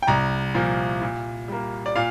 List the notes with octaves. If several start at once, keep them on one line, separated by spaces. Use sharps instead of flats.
G5
C2 A#5
A#2 F3 A#3
A#2
G3 A#3
D5
A#2 F5